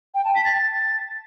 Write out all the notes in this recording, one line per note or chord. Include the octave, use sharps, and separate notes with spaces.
G5
A5
B6
A6